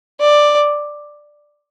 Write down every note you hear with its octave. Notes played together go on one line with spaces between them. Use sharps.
D5